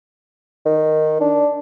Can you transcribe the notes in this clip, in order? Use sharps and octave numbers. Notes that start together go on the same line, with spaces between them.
D#3
D4